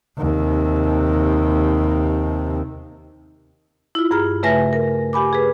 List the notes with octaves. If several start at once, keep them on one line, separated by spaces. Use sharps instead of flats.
D#2 C3
E4 F4
G2 G#4 A#5 F6
C#3 A3 B4 E5 G#5 A#6
A#4
G4 G#5 B5 D6
G#4 B4